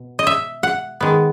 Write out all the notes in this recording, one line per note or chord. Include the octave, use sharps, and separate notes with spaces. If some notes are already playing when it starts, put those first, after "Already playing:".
Already playing: B2
D#5
E5
F#5
D#3 G#3 B3